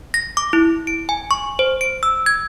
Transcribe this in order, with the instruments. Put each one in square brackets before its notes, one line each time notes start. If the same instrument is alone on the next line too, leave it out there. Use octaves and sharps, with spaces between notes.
[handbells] A#6
D6
E4
D7
G#5
C#6
C5
D7
E6
G#6